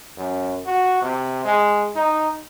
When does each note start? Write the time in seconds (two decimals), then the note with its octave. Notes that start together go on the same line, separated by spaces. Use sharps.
0.17 F#2
0.66 F#4
1.02 C3
1.45 G#3
1.96 D#4